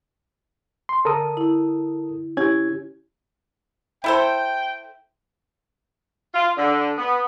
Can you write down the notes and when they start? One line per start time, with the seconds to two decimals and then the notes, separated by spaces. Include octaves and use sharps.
0.89 C6
1.05 D3 A4 A#4 D#6
1.37 E4
2.37 C#4 E4 G4 G#6
4.04 E4 A4 C5 G5
6.34 F4
6.56 D3
6.97 B3